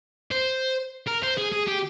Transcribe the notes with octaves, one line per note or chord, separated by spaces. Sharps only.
C5
A#4
C5
G#4
G#4
G4